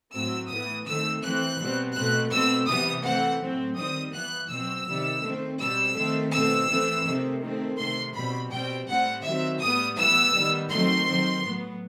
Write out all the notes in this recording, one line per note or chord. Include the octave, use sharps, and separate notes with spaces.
A2 F#3 C4 E6
A2 E3 B3 D#6
D#3 A3 C4 E6
E3 A3 C4 F#6
B2 G3 C4
B2 A3 C4 F#6
B2 A3 C4 E6
C3 E3 G3 B3 D#6
E3 A3 C4 F#5
A2 F#3 C4
D#3 G3 C4 D#6
E3 B3 F#6
B2 F#3 C4 E6
C3 D#3 G3
D#3 A3 C4
B2 G3 C4 E6
D#3 A3 C4
B2 A3 C4 E6
E3 A3 C4
C3 D#3 A3 C4
D#3 A3 C4
C3 D#3 A3 C6
B2 G3 C4 B5
B2 G3 C4 G5
A2 G3 C4 F#5
D#3 F#3 C4 E5
A2 G3 B3 D#6
A2 E3 G3 B3 E6
D#3 G3 B3
D#3 F#3 A3 C4 C6
D#3 F#3 C4
A2 F#3 B3